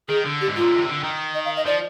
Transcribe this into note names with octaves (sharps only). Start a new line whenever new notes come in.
D#3 G#4
D3
G4
G#2
F4
A#2
C3
D3
D#3
D#5
F5
D#5
F3 D5